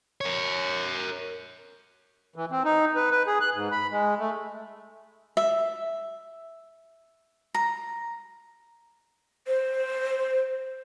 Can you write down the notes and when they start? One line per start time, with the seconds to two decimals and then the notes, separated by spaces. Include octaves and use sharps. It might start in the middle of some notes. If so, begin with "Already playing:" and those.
0.21 A#4 C#5
2.36 E3
2.51 C4
2.65 D#4
2.96 B4
3.11 B4
3.27 G#4
3.41 F#6
3.54 G#2
3.72 B5
3.91 G#3
4.19 A3
5.37 E5
7.55 A#5
9.47 C5